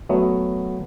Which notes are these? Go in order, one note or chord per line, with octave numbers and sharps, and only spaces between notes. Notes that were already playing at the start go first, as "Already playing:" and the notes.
F#3 A3 B3